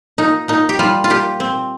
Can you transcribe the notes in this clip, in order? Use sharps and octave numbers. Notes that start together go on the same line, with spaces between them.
A#2 D#4
A#2 D#4
G4
G3 F4
F4
A#2 G4
C4